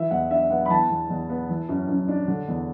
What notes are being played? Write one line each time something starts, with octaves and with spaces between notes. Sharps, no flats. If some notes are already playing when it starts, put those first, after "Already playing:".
Already playing: E3 E5
E2 F#5
D4 E5
B3 F#5
B5
E3 A5
E2
E2
B3
E3
F#2
F#2
D4
D3
E2